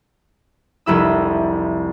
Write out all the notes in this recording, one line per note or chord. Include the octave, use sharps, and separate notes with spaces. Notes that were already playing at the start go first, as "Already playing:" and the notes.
F1 C2 E4 E6